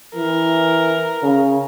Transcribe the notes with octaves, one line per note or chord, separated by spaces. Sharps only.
E3 A#4
C#3